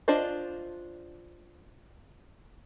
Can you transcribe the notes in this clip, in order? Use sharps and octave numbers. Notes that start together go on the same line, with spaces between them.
D4 F4 C5 D5 D#5